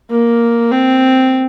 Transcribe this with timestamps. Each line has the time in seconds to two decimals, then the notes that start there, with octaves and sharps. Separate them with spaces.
0.10 A#3
0.71 C4